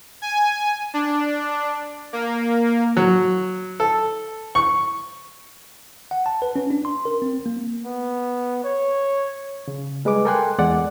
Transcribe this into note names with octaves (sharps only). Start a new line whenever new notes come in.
G#5
D4
A#3
F#3
A4
C#6
F#5
A5
B4
C#4
D4
C6
A#4
C4
A#3
B3
C#5
C#3
G3 G#3 B4 D6
A4 A#4 G5 G#5 C6 F#6
E2 G#3 D5 F#5